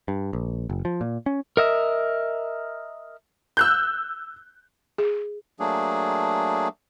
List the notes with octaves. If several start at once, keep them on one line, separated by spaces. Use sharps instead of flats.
G2
A#1
F#1
F3
A#2
C#4
A#4 D#5 E5
E6 F#6 G6
G#4
F#3 A3 A#3 D4 G#4